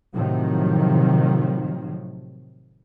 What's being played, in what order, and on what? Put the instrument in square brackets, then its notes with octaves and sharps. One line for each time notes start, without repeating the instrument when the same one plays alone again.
[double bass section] A2 C3 D#3 F3 F#3